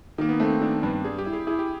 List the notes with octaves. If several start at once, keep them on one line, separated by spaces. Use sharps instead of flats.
D#3 A#3
B3
A3 C4
C4
D#3 D4
G2 D4
G3 G#4
G4
E4
G#4
E4 G#4
G4